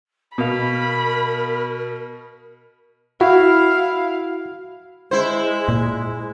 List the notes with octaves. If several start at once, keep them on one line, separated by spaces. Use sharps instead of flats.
B2 B3 A#4 F5 B5
E4 F#4 F5
G#3 E4 C5
A#2